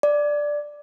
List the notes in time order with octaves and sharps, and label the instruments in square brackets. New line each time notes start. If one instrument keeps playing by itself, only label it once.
[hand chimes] D5